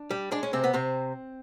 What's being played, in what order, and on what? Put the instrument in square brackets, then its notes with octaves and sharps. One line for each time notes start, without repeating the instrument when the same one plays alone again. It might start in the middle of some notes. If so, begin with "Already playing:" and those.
Already playing: [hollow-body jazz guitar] D4
G3
G#3 D4
C#4
C3 C4
B3
C3 C4